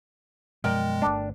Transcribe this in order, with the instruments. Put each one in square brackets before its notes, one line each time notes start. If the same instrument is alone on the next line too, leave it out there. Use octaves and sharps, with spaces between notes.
[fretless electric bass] F#2 B2 F3 [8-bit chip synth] G#3 [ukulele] A#4 D5 G5
[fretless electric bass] G1 A3 [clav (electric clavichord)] D4